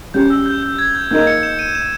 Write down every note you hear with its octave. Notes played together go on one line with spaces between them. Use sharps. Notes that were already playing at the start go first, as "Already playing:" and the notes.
G3 C#4 G4 G6
E6
G6
G6
G#6
G6
A#3 D#4 A#4 G6
C#7
E7
D#7
E7